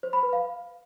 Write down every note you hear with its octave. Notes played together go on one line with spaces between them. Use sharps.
C5
B5
B4
F5